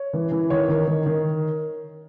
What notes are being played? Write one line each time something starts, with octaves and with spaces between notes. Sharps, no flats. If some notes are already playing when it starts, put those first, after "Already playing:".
Already playing: C#5
E3
E3
D#3 C#5
D#3
D#3
D#3